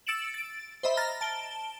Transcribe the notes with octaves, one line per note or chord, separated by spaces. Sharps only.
E6 A6 C#7 D7 E7 F#7
A6 D7
C5 D#5 E5 B5
A#5 F6 A6 A#6
A5 D7 G7